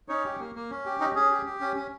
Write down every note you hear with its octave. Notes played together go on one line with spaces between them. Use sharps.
C#4 D#4 C#5
G4
A#3
A#3
C#4
G4
C#4 D#4 D#5
C#4 G#4
G4
G4
C#4
C#4